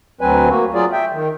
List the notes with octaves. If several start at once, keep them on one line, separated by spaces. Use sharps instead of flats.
D2 F#3 C4 B4 G#5
A#3 F#4
F#3 F4 G#4 D5
E5 G5
D#3